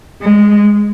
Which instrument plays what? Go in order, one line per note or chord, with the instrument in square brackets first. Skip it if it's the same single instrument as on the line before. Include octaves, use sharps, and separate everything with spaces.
[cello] G#3